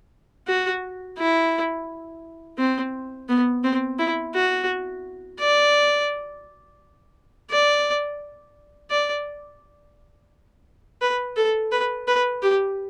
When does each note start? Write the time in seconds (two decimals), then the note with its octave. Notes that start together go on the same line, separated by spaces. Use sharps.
0.47 F#4
1.18 E4
2.58 C4
3.29 B3
3.64 C4
3.99 E4
4.35 F#4
5.39 D5
7.50 D5
8.90 D5
11.02 B4
11.36 A4
11.72 B4
12.07 B4
12.42 G4